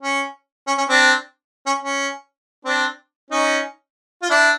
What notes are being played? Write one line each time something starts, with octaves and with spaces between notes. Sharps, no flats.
C#4
C#4
C#4
C4 D4
C#4
C#4
C4 D4
C#4 D#4
F4
D4 E4